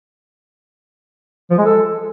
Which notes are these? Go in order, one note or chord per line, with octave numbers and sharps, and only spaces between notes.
F3
G#3
A4